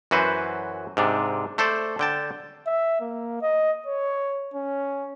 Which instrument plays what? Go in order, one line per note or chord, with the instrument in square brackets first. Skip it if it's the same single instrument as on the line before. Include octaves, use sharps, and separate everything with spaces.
[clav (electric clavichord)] F#2 E3 F#4 B4 C5
G#2 C3 D4
A3 A4 C5 D5
D3 G5 A5
[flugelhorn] E5
A#3
D#5
C#5
C#4